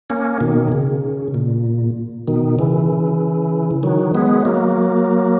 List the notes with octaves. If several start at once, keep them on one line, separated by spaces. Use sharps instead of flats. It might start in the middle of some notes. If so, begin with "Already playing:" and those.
A#3 C#4
B2 D#3
C#3
A#2
B2 D#3
C#3 E3
D#3 F#3
G#3 B3
F#3 A#3